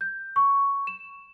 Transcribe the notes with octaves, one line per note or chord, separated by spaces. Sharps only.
G6
C#6
E7